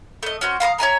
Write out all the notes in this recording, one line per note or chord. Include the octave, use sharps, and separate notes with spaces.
A3 D#5
C#4 F#4 C5
F5 A#5 C6 D#6
C#5 E5 G#5 A#5